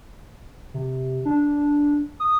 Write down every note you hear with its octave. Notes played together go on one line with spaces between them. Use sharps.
C3
D4
D#6